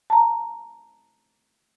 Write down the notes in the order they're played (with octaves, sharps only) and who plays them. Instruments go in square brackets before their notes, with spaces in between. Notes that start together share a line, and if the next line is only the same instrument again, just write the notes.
[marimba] A5 A#5